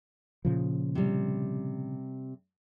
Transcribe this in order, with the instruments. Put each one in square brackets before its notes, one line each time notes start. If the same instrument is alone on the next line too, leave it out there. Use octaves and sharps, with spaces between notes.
[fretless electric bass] A#2 C#3 F3
[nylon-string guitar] C3 G3